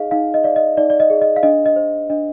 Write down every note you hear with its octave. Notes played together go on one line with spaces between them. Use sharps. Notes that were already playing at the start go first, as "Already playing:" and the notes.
Already playing: D#4 G#4 D#5 F5
D#4 F5
D#5
D5 F5
D#5
D#4 D5
D5
D#5
G#4
D#5
F5
D4 D#5
D#5
C5
D4 D#5